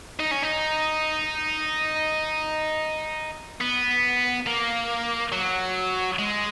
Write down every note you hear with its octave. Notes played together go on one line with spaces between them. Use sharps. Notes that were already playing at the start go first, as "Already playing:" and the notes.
D#4
C#4
D#4
B3
A#3
F#3
G#3